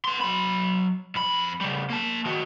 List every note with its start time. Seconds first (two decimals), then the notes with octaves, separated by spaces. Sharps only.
0.05 B3 C6
0.21 F#3 B5
1.15 F2 B5
1.61 C#3 G3
1.90 A#3 A5
2.25 D#3 F#4